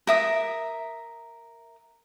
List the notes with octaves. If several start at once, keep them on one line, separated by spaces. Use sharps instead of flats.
A#4 E5 D#6